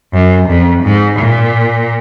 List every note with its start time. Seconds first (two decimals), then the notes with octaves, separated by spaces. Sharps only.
0.13 F#2
0.49 F2
0.83 G#2
1.18 A#2